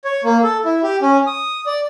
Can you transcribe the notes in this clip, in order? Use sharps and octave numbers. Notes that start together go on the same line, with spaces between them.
C#5
A#3
A4
E4
G4
C#4
D#6
D5